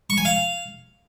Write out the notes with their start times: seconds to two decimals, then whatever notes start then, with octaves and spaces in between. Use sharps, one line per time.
0.10 C#6
0.17 G#5
0.25 F5